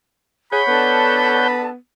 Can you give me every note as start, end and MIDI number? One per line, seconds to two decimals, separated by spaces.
0.52 0.63 68
0.52 1.48 73
0.52 1.48 78
0.52 1.63 83
0.52 1.48 91
0.68 1.75 59
0.68 1.69 62
0.68 1.69 69
0.68 1.69 81